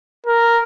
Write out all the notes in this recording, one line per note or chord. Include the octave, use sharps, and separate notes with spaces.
A#4